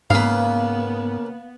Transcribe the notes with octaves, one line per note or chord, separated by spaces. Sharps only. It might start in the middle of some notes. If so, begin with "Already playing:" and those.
G#2 C#3 A#3 B3 B4 F5